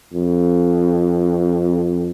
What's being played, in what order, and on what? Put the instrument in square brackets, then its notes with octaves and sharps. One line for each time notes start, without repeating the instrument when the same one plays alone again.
[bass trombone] F2